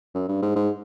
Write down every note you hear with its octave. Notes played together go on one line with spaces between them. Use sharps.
F#2
G2
G#2
G#2